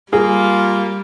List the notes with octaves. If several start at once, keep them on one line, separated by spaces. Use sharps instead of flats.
G3 A#3 F4 G#4